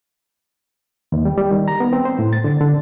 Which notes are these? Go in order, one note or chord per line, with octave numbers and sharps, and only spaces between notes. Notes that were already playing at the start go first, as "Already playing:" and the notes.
D#2
G3
G3
D#3
A#5
B3
C4
C5
A2
A6
D3
D3